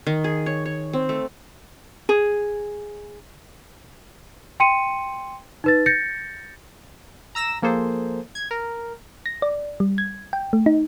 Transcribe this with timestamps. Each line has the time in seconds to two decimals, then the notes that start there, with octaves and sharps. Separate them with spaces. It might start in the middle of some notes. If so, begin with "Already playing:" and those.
0.07 D#3
0.24 G#4
0.46 C#5
0.66 C#5
0.93 C4
1.09 A3
2.09 G#4
4.60 G5 C6 C#7 D#7
5.64 D#4 B4 A6
5.86 G6 A6 A#6 C#7
7.35 A#5 E6 A#6 E7
7.62 F3 A#3 G#4 A4 C5
8.35 G#6
8.51 A#4
9.26 A#6
9.42 D5
9.80 G3
9.98 G#6
10.33 G5
10.53 A3
10.66 D#4